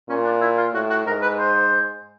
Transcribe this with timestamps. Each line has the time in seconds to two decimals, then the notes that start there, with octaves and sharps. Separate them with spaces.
0.09 A#2 C#4
0.24 D4
0.41 E4
0.58 F4
0.73 A2 F#4
0.90 F#4
1.06 G#2 A#4
1.22 B4
1.39 C5